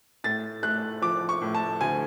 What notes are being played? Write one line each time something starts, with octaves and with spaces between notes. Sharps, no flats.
A2 A6
A3 F#6
F3 D6
C#6
A2
A5
D2 G#5